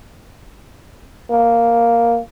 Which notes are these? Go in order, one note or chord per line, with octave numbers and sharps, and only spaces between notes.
A#3